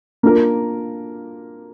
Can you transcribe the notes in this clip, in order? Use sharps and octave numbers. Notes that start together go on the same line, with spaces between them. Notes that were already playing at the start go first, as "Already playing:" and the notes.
A#3 D4 F4 A#4